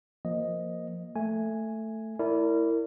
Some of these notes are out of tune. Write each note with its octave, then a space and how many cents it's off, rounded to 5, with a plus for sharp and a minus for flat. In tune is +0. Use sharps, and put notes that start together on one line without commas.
F3 +0 A#3 +0 D#5 +0
A3 +5 G#5 +0
E4 +0 A#4 -25 D5 -30